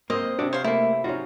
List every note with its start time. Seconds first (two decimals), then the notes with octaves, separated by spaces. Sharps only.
0.10 A#3 C4 A#4 C5 D#5
0.39 C3 D4 F#4 D5 E5
0.53 C5 C#5 F5
0.64 A3 A#3 E4
1.04 C#4 D#4 F4 F#4